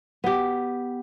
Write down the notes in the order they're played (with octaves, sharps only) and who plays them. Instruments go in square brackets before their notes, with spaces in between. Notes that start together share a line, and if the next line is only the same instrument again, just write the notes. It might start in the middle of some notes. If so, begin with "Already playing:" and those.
[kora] B3 G4